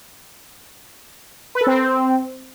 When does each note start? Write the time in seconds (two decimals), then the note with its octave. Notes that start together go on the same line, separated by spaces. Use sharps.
1.55 B4
1.61 A4
1.67 C4